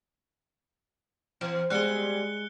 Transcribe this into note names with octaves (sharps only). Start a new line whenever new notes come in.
E3 F3 C4
G3 G#3 B3 C4 G#4 F#6 C#7 G7